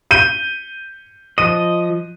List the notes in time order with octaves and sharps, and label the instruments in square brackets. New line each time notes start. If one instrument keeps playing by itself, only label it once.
[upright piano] G6 D#7
[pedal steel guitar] F3 D#5 [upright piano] D#7